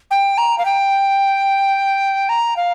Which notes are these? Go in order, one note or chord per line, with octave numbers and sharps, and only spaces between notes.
G5
A#5
F5
G5
A#5
F5